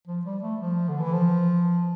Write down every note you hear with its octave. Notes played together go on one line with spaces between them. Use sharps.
F3
G3
A3
F3
D3
E3
F3